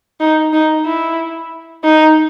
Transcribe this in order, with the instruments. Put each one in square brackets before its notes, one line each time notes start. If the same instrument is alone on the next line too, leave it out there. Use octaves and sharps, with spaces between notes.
[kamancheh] D#4
D#4
E4
D#4